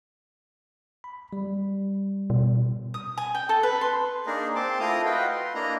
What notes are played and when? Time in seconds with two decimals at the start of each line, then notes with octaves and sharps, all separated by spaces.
1.04 B5
1.33 G3
2.30 B2
2.94 D#6
3.18 G#5
3.35 G5
3.49 A4
3.63 B4
3.81 C6
4.26 A#3 D4 D#4 G#4 A#4
4.55 C4 A5 C6 D6
4.80 A3 E4 F4 A#4 A#5 D#6
5.05 F#4 B4 D#5 F5 G5
5.31 C6
5.54 A#3 D4 E4 D#5 A#5